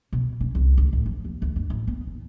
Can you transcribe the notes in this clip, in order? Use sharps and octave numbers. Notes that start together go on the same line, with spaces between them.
B2
C#4
C2
D2
A2
F3
D#2
D2
G2
A1
B3
D#2